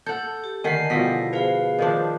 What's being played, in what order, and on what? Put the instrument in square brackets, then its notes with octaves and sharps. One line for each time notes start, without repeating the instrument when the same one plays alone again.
[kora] A4 F#5 [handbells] G6
[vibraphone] G4
[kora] D3 D#3 [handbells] G#5 B6 C7 [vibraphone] A5
[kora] B2 F3 G3 [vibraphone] B3 E4 [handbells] A#6 B6
[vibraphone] G#4 C5 [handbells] B4 F5
[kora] D#3 F3 D4